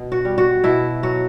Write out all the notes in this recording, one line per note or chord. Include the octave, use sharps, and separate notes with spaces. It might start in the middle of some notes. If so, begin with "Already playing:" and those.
Already playing: B2
F#4
G3
F#4
B2 E4
F#3 F#4